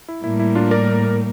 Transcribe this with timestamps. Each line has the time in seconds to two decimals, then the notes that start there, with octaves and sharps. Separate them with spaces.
0.09 E4
0.24 A2 G3 A#3 E4
0.39 E4
0.55 D4 F4
0.71 A#4 D5